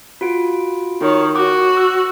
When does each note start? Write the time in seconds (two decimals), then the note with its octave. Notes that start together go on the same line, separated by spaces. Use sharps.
0.21 F4 F#4 D7
1.01 D#3 C#5
1.36 F#4 D6
1.77 E6